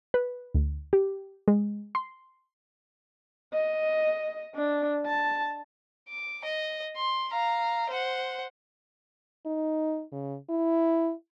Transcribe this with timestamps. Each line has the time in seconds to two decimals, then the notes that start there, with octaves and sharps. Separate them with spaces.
0.14 B4
0.54 D2
0.93 G4
1.48 G#3
1.95 C6
3.53 D#5
4.55 D4
5.06 A5
6.09 D6
6.45 D#5
6.96 C6
7.32 F5 A#5
7.90 C5 F#5
9.46 D#4
10.12 C#3
10.50 E4